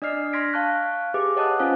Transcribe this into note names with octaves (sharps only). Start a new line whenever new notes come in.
D4 D5 D#5 F6 C7
C6 F6 G#6 A#6 B6 D7
F5 A5 C#6 F#6
G4 G#4 B4 E5 D6
C#5 D#5 F#5 A5 D#6 F#6
C#4 F4 C5 F5 G#5